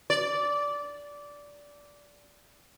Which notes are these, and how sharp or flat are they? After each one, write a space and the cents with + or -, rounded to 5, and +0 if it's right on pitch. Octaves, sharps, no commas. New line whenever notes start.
D5 -15